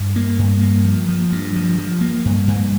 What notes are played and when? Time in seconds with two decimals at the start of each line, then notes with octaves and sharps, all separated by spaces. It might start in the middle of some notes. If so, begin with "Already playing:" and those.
Already playing: G2
0.16 A#3
0.39 G2
0.61 A#3
0.85 F3
1.08 F3
1.32 G2
1.56 F3
1.79 F3
2.01 A#3
2.25 G2
2.47 G2